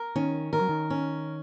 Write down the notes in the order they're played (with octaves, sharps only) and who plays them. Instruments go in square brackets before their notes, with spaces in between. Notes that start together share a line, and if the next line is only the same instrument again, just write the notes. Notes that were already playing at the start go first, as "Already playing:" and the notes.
Already playing: [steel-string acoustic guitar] A#4
[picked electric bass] D#3 [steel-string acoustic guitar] C#4
[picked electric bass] D#3 [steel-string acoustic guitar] A#4
[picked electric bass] F#3
D#3
[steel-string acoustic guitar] C#4